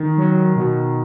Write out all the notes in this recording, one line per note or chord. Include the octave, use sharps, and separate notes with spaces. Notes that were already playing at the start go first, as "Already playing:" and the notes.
Already playing: D#3
F#3
B2